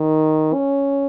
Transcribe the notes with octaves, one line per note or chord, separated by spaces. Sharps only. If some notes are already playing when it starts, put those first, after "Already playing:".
Already playing: D#3
C#4